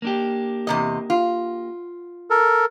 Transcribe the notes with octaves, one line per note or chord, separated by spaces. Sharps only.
A#3 D4 G4
E2 C3 D#5
F4
A4 A#4